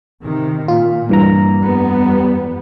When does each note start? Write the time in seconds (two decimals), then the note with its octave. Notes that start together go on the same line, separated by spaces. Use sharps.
0.22 C3 D#3
0.68 A#2 F4
1.09 G2 E3 A#3 A#5
1.56 F2 G3 B3